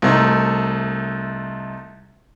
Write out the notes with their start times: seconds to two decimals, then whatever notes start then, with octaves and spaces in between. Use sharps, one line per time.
0.02 C2 A3 D#4